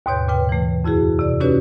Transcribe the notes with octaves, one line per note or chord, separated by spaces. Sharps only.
D#2 G#2 B2 C#5 G6
A#2 C#3 B4 G5
E3 A3
F2 E4 F#4 G#4
C3 D5
C#4 D#4 F#4 G4 B4 C#5